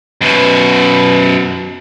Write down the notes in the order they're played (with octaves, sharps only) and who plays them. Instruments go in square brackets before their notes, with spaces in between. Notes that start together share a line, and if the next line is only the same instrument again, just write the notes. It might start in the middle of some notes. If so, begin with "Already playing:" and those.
[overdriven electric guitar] F#2 B2